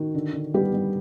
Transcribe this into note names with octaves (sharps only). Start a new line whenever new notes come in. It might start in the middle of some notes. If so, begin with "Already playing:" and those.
Already playing: D#3 F#4
D3
D3
G3 B3 G4
G3